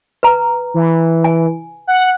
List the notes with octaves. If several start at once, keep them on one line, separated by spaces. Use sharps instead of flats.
B4 A#5
E3
G#5
F#5